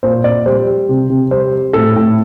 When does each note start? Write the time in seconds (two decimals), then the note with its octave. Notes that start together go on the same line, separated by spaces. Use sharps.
0.03 A#2 C5
0.24 A#2 D5
0.46 G3 C5
0.67 G3
0.89 C3
1.10 C3
1.31 G3 C5
1.53 G3
1.73 A2 A4
1.96 A2